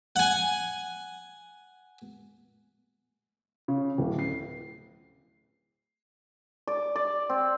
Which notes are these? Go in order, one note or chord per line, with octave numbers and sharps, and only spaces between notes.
F#5 G#5
C#3
D1
C7
D5
D5
C4